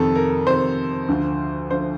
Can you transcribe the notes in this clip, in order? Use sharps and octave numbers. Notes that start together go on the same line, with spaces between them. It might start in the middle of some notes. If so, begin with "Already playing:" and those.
Already playing: F2 C3 D#3 A4
A#4
F2 C3 D#3 C5
D2 D3 F3
D3 F3 C5